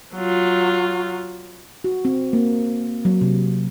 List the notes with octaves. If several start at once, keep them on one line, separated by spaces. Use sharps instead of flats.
F#3 F4
F#4
C4
A#3
F#3
C3